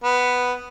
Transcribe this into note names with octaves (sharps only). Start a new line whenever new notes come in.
B3